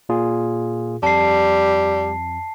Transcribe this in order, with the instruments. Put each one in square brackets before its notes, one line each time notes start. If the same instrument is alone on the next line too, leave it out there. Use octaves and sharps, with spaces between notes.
[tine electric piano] A#2 F4 G#4
[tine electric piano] F2 [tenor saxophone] G3 [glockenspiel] A5 C7